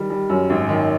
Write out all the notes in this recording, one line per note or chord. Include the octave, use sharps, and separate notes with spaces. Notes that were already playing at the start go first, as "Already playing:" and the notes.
Already playing: D#3 G3
G3
F#2
G#1
D#3